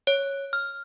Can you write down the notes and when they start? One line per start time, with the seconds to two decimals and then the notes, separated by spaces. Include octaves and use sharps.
0.07 C#5
0.53 F6